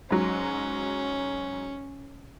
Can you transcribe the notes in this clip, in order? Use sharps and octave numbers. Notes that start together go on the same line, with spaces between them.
G#2 F#3 C#4